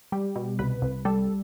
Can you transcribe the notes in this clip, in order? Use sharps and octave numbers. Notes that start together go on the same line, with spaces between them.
G3 G4
B2
C2 B4
C2
G3 A4